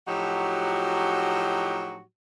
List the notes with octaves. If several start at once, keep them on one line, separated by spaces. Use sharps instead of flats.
A2 F3 F#3 D#4 F#4 G4